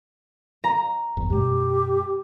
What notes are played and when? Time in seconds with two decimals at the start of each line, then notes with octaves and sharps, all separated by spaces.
0.64 A#5
1.17 G1 E2
1.30 F#2 B2 G#3 G4